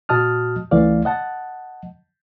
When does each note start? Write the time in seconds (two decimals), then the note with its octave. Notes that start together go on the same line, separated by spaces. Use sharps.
0.09 A#2 F#4 D#5 A5 D#6 F6
0.71 C#2 E3 A3 D5 F5
1.05 D#5 F#5 A5